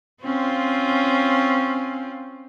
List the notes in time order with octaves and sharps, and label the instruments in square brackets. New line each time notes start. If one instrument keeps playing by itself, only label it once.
[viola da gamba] C4 C#4 F4